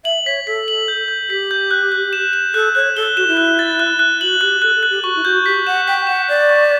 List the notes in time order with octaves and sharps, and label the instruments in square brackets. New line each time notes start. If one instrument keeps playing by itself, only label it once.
[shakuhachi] E5 [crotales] F#7
[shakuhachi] C#5 [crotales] B6
[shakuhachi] A4 [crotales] B6
[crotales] F#7
G6
G6
[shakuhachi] G4 [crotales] B6
[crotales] G6
F#6
F#6
E7
E7
[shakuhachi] A4 [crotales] F#6
[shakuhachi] C#5 [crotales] F#6
[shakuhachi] A4 [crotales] G7
[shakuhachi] F#4 [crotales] E7
[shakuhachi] E4
[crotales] F#6
A6
F#6
F#6
[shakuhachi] F#4 [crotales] F#7
[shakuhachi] G4 [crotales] F#6
[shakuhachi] A4 [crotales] F#6
[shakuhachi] A4
[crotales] F#6
[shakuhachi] G4
[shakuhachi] F#4 [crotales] C#6
[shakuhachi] E4
[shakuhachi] F#4 [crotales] G6
[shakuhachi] G4 [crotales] B6
[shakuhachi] F#5 [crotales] E7
[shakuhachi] G5 [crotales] B6
[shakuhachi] F#5 [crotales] E7
[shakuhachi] D5 [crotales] B6
[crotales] C#6